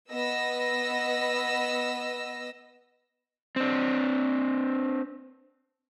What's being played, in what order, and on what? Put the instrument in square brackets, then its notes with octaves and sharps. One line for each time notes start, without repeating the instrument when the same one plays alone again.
[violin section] B3 D#5 E6 A#6
[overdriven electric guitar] C4 D4